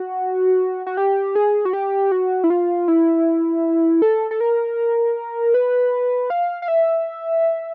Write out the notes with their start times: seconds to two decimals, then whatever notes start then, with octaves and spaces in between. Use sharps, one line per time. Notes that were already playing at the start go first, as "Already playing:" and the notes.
Already playing: F#4
0.87 F#4
0.97 G4
1.35 G#4
1.65 F#4
1.73 G4
2.11 F#4
2.44 E4
2.50 F4
2.88 E4
4.02 A4
4.31 A4
4.40 A#4
5.54 B4
6.30 F5
6.62 F5
6.68 E5